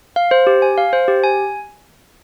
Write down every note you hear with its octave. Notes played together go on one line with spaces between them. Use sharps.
F5
C5
G4
G#5
F5
C5
G4
G#5